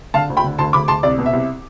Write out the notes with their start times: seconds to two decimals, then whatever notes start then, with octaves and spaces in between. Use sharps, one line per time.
0.14 D3 F5 A5
0.30 D2
0.37 G5 B5
0.44 D3
0.58 D2 A5 C6
0.73 D2 B5 D6
0.88 D2 A5 C6
1.03 C2 D5
1.18 B2
1.26 E5
1.33 C2